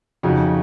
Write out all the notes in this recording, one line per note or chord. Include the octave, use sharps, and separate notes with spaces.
F2 C#3 D#4 F#4